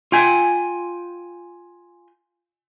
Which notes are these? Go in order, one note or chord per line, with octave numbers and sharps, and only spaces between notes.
F4 G5 G#5